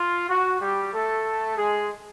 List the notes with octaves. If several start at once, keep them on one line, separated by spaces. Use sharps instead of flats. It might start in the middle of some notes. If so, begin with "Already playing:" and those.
Already playing: F4
F#4
G3 G4
A3 A4
G#3 G#4